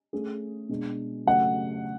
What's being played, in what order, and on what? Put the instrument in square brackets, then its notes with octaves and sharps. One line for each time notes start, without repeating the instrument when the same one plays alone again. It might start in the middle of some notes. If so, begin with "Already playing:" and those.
[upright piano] A3 C#4 G#4
B2 G#3 D4
[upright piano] C#3 F#3 A3 [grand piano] F#5